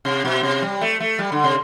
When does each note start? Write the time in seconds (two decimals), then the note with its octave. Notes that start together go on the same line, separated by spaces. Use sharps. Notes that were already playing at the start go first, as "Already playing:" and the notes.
0.05 C3
0.25 B2
0.43 C3
0.62 G3
0.81 A3
1.00 A3
1.19 G3
1.32 D3
1.44 C3